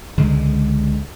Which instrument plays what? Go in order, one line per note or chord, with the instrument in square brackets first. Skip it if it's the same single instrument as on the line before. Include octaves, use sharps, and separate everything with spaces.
[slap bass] C#2 D3 G#3